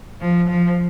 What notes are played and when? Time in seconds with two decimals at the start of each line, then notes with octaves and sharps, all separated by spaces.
0.21 F3
0.49 F3